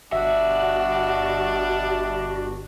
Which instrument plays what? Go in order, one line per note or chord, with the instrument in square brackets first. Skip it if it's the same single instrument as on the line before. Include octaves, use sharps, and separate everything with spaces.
[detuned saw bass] G1 [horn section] B2 G3 D4 [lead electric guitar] F#4 [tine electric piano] E5